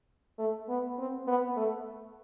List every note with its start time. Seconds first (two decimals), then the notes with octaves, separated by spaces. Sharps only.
0.38 A3
0.69 B3
0.98 C4
1.28 B3
1.56 A3